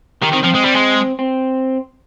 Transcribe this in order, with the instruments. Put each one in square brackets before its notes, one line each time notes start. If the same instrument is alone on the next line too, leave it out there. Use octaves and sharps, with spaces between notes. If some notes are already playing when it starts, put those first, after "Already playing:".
[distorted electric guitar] D#3 [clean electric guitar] G4
[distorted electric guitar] D#3 [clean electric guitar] C4
[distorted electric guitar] F3 [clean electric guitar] C4
[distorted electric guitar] G#3
G3
G#3
[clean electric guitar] C4